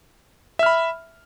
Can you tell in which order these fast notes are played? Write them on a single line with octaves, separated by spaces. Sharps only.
E5 F6 B5